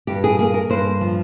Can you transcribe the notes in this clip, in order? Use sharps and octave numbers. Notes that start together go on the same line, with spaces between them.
G2 G4
G#4
A#3 G#4
A#4
G2 C5
F3